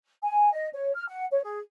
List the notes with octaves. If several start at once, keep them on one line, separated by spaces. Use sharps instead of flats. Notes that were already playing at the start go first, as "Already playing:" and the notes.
G#5
D#5
C#5
F6
F#5
C#5
G#4